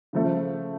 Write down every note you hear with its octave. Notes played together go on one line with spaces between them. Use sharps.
C#3 F3 A3